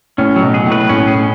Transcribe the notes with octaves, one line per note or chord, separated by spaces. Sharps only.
A2 C#4
F#3
B2
G#4
A2
B4
A2 C#4
G#4